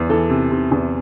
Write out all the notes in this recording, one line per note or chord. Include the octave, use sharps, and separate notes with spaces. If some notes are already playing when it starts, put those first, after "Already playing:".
Already playing: E2
E3 A4
C3
C3
E2